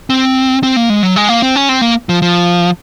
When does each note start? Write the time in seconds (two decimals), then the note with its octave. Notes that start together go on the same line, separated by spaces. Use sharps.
0.10 C4
0.63 C4
0.76 A#3
0.90 G#3
1.03 F#3
1.16 G#3
1.29 A#3
1.42 C4
1.56 C#4
1.69 C4
1.82 A#3
2.09 F3
2.22 F3